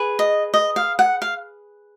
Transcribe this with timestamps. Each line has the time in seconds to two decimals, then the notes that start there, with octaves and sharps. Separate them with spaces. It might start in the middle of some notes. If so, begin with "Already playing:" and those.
Already playing: G#4 B4
0.19 D#5
0.54 D#5
0.76 F5
0.99 F#5
1.22 F5